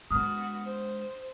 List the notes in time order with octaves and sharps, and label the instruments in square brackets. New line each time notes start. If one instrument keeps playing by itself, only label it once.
[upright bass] G#3 D4 [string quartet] B3 F#4 [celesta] D#6 F6
[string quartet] C5